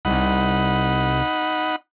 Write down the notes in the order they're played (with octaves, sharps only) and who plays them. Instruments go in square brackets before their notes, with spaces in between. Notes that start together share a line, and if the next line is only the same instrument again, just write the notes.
[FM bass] C2 [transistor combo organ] D#4 F#5 B5